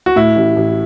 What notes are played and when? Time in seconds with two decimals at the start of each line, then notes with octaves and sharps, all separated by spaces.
0.06 F#4
0.16 A2 E4
0.36 A1
0.56 A1